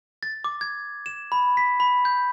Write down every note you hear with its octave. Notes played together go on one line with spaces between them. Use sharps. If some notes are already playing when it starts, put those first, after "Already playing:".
A6
D6
G#6
E7
B5
B6
B5
G6